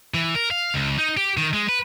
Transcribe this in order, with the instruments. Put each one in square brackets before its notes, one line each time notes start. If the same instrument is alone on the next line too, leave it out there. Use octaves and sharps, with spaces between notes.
[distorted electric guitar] E3
A#4
F5
C#2
D#4
G4
D#3
G#3
B4